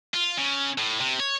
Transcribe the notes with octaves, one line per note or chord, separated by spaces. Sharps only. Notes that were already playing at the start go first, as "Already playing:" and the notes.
F4
C#3
A2
C3
C#5